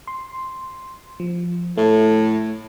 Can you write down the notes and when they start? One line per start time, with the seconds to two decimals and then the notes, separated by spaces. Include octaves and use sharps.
0.07 C6
1.20 F3
1.78 A2 A3